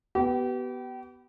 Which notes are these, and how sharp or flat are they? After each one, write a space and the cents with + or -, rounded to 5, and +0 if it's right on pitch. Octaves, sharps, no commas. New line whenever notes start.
B3 +0 G4 -35